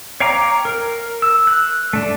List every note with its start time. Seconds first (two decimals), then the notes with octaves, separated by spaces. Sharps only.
0.20 C#5 F5 G5 A#5 D6
0.65 A#4
1.22 E6
1.47 F#6
1.93 A3 D4